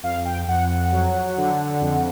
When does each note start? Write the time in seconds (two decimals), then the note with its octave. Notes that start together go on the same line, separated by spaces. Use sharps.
0.03 F2 F5
0.25 G5
0.48 F2 F#5
0.70 F#5
0.92 F#3
1.38 D3
1.81 F2